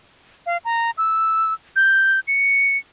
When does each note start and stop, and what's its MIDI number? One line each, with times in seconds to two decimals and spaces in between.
0.46 0.57 77
0.65 0.91 82
0.98 1.54 88
1.76 2.20 91
2.28 2.77 97